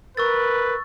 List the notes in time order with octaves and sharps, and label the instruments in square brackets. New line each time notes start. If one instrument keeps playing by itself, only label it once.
[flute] A#4 [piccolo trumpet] B4 [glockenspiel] C#6 E6 A6